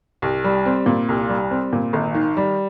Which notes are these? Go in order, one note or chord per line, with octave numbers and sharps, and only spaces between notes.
C2
G3
C4
A#2
C2
G3
C4
A#2
G#1
D#3
G3